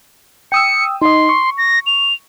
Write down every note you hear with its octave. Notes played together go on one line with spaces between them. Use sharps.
G5 D#6 E6 C#7
D#4 D#5 C6
C#6
A#6
F7